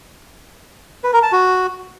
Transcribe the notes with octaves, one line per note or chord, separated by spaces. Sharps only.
B4
A#4
A5
F#4